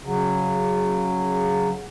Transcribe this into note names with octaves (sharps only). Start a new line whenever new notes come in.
C#3 F#3